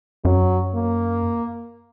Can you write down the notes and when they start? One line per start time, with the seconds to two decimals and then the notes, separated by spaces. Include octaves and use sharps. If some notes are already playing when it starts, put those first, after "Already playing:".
0.25 F#2 F#3
0.75 A#3